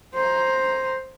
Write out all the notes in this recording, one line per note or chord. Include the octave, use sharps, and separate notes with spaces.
C5 A#5